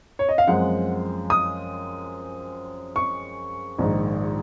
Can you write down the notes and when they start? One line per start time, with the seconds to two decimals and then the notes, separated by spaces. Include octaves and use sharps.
0.19 C#5
0.29 D#5
0.38 F5
0.47 F#2 F3 G#3 C4 F#5
1.30 D#6
2.96 C#6
3.78 A#1 G#2 D#3